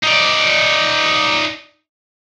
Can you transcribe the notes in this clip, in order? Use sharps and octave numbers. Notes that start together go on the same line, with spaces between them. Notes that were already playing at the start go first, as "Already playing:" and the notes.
D#4 D5